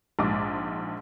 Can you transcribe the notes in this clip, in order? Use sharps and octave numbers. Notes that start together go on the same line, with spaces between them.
A#1 G#2 D6